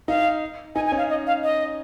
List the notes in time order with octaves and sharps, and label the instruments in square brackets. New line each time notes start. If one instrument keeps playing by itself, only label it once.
[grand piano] D#4 [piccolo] F5
[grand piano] D#4 [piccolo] G#5
[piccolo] G#5
[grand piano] C#4
[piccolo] F5
D#5
F5
D#5